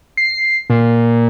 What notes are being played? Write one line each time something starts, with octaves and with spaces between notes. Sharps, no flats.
C7
A#2